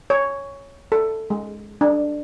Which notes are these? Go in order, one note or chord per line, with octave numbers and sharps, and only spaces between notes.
C#5
A4
G#3
D4